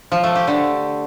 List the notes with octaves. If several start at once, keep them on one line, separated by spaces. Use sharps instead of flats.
F3
A3
G4
D3